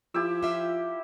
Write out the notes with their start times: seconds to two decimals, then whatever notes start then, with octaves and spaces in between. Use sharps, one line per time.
0.14 F3 E4 G4 E6
0.43 F4 E5